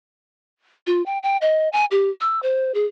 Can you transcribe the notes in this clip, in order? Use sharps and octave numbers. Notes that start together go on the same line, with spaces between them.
F4
G5
G5
D#5
G#5
G4
E6
C5
G#4